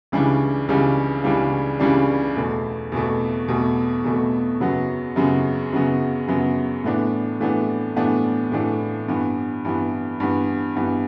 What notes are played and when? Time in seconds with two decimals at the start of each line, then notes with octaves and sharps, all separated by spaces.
0.12 C#2 C#3 E3 G3 D4
0.69 C#2 C#3 E3 G3 D4
1.24 C#2 C#3 E3 G3 D4
1.80 C#2 C#3 E3 G3 D4
2.36 E2 B2 A3
2.92 E2 B2 A3
3.48 E2 B2 A3
4.04 E2 B2 A3
4.60 F#2 C#3 F#3 B3
5.16 F#2 C#3 F#3 B3
5.72 F#2 C#3 F#3 B3
6.28 F#2 C#3 F#3 B3
6.84 A2 E3 B3 D4
7.40 A2 E3 B3 D4
7.96 A2 E3 B3 D4
8.52 A2 E3 B3 D4
9.08 G2 E3 B3
9.65 G2 E3 B3
10.20 G2 E3 B3
10.76 G2 E3 B3